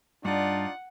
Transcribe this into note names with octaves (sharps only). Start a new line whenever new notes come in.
G2 D4 D#4 F4 D5 F#5